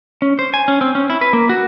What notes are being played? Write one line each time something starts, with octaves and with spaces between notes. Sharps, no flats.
C#4
C5
G#5
C#4
C4
C#4
E4
B4
A#3
F#4